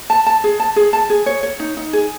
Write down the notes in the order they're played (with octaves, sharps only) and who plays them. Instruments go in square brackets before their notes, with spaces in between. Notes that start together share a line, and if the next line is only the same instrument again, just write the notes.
[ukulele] A5
A5
G#4
A5
G#4
A5
G#4
C#5
C#5
D#4
D#4
G#4